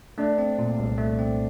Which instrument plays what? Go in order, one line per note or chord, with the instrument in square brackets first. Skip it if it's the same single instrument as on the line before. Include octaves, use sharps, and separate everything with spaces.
[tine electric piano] A3 [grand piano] D4
[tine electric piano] C4
A#2
C2
A3
C4